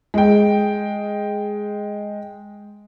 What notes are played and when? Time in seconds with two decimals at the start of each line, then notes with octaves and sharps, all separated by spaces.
0.14 G#3 G5